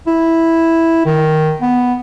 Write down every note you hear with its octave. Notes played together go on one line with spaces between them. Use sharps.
E4
D#3
B3